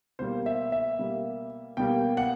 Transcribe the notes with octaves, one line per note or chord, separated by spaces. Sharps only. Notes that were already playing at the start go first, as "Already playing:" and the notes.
B2 G3 A#3 C5
E5
E5
B2 G3 A#3
B2 G3 A#3 G5
F#5